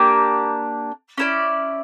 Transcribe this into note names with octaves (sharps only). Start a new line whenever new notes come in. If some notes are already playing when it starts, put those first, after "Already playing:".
Already playing: A#3 D4 G4
C#4 E4 A#4 D5